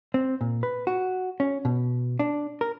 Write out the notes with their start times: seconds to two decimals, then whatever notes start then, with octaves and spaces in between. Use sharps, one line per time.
0.14 C4
0.41 A#2
0.63 B4
0.87 F#4
1.40 C#4
1.65 B2
2.19 D4
2.61 A#4